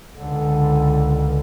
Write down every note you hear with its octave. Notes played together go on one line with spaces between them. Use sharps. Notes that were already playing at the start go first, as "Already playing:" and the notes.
C#2 D3